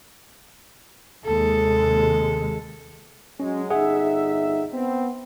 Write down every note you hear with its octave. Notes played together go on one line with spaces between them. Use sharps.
D#2 C3 G#3 A4
F#3 G#3 C#4
G1 D#4 G#4 E5 F#5
B3 C4